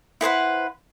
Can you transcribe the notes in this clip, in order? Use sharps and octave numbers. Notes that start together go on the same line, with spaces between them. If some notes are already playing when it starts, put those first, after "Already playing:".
E4 B4 C5 F#5